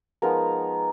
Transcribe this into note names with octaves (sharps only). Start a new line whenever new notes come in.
F3 G#3 B3 D#4 A#4